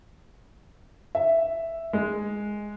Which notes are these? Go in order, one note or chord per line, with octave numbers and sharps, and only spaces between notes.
E5
G#3